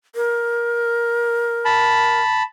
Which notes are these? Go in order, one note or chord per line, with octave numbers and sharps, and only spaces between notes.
A#4
A5 B5